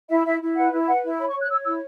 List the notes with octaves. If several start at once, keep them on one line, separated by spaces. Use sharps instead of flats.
E4 E5
E4 E5
E4
B4 F#5
E4
B4 F#5
E4
C#5 B5
C#6
C#5
F#6
C#5 E6
E4 E6